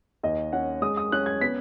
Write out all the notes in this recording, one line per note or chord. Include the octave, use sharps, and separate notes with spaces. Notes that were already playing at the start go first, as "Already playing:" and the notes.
D#2 D#5
C#4 F#5
G#3 D#6
D#6
C#4 F#6
G#6
B3 B6